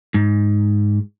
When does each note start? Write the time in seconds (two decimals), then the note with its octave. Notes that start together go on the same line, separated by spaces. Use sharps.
0.14 G#2